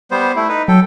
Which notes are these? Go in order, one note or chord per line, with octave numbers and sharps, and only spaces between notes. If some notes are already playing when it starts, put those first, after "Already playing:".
G3 B3 C5
A3 E4
D#4 B4
F#3 A4 G5